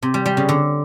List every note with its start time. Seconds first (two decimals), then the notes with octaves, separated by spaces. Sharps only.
0.02 C3
0.14 G3
0.26 G3
0.37 C#3
0.49 D3